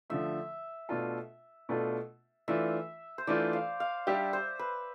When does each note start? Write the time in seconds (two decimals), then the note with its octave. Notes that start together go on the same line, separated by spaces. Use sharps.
0.10 D3 F3 A3 E5
0.89 B2 A3 D4 F4 A4
1.69 B2 A3 D4 F4 A4
2.48 E3 A3 D4 F4 E5
3.18 C5
3.27 E3 A3 D4 F4 D5
3.53 F5
3.80 F5
4.07 G3 D4 G4 E5
4.33 C5
4.59 B4